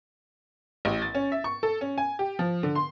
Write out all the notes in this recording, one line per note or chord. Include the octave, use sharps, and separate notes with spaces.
A1
A6
C#4
E5
C#6
A4
C#4
G#5
G4
F3
D3
C6